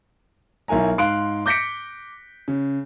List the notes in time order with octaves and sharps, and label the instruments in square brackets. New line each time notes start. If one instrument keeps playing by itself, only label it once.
[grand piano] B1 E4 A#4 G#5 A#5
G#2 F5 C6 F#6 D7
D6 G6 A#6 B6 C#7 D7
C#3